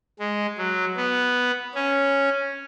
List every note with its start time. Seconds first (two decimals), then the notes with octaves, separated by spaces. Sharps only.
0.19 G#3
0.58 F#3
0.97 B3
1.74 C#4